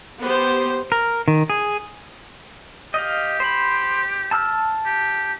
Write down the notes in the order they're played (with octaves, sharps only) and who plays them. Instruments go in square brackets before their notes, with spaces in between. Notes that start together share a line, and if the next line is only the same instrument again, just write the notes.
[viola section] B3 G4 C5
[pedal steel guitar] A#4
D#3
G#4
[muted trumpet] G4 [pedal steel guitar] D#5 F5
[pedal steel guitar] C5 B5
A5 E6 F6
[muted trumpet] G4